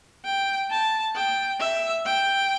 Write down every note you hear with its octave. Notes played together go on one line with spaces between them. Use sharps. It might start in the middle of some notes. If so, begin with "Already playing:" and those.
G5
A5
G5
E5
G5